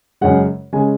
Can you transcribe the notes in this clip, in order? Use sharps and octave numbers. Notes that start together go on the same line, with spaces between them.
F#2 C#3 G#3 F#5
C#3 G#3 G#5